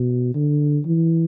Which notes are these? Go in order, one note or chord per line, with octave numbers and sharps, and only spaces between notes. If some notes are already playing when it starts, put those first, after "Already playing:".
Already playing: B2
D3
E3